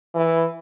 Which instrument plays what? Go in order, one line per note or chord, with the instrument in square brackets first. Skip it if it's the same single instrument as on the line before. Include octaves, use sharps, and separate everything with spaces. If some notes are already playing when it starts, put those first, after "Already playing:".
[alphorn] E3